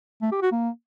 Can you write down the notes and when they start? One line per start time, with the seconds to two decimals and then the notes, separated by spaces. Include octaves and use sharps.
0.22 A3
0.32 G4
0.42 F#4
0.52 A#3